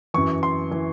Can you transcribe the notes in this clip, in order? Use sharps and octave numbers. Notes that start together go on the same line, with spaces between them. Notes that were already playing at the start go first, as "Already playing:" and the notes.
F#2 E3 C#6
C6
E3